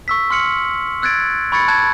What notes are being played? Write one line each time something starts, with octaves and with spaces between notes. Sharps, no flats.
C#6 E6 B6
C6 F6 C#7 F#7
E6 F#6 G#6 A6 D7
B5 C#6 G#6 A6 C#7
A5 F#6 G#6